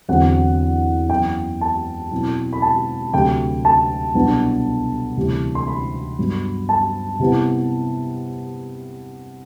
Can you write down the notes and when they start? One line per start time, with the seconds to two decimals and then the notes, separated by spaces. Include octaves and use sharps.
0.08 E2 D3 F#3 C4 E4 F#5
1.09 F#2 E3 B3 G5
1.61 A5
2.12 B2 F#3 C4 E4
2.53 B5
2.62 A5
3.13 D2 C3 F#3 G5
3.65 A5
4.15 C2 B2 F#3 B3 D4
5.17 D2 C3 E3 G3
5.55 C6
5.67 B5
6.18 G2 F#3 B3
6.69 A5
7.20 C3 G3 B3 E4